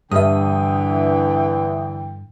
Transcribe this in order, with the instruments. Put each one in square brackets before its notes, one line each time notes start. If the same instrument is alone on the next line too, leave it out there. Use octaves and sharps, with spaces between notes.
[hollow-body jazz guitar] G2 [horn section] D3 E3 G5 [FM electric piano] E5 D#6